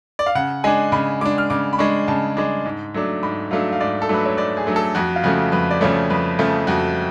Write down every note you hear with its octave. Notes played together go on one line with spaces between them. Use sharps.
D5
F5
C#3 F#5
G#3 D4 G#5
C#3 B5
G#3 D4 D6
F6
C#3 D6
B5
G#3 D4 C#6
C#3 A5
G#3 D4
G#2
F#3 A3 D4
G#2 B5
F#3 A3 D4 F5
F5
G#2 D5
A4
F#3 A3 D4 B4
C#5
G#2 D5
G#4
F#3 A3 D4
A4
F2 F#4
F4
C#3 F3 A3 F#4
F2 B4
D5
C#3 F3 A3 C#5
F2 B4
C#3 F3 A3
F2 F#4